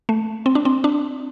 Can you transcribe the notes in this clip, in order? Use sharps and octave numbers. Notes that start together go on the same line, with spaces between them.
A3
C4
D4
C4
D4